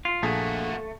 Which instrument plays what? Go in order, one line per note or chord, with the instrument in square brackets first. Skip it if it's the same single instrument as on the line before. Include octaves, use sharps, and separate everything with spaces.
[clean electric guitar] F4
[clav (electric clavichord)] A#1 G#4 [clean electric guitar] A3 [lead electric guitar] A#3 F#4